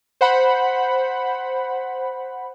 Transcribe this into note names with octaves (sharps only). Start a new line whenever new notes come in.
C5 F#5 B5